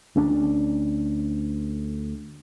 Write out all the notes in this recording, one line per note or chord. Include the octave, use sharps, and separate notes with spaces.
D2 C#4 D4